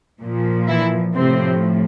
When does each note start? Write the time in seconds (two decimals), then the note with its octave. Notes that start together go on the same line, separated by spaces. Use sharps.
0.21 A#2 F3
0.68 E3 E4
1.15 A2 C3 F3 C4